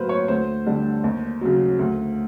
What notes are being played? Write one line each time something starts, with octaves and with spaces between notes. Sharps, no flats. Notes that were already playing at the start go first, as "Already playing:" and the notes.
Already playing: A2 F#3 A#3 B4 C5
C#5
D2 C5
D3 G3
D#2
C#3 F#3
D2